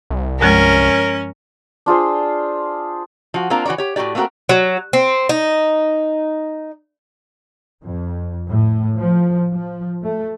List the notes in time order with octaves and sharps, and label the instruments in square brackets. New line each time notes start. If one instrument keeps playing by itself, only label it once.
[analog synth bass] C2
[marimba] G2 F3 G#3 [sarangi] C#4 [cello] A#4
[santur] D4 F4 G#4 C5
[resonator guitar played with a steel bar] F3 F#4
A#3 C4 D4 F4 A#4
E3 F#4 A#4 C#5 D5
G4 C#5
A2 C4 F#4 G4 D5
A3 A#3 C4 E4 F#4 A#4
[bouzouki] F#3
C4
D#4
[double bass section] F2
A2
F3
F3
A3